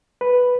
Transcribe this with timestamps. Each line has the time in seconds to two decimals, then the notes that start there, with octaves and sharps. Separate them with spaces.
0.21 B4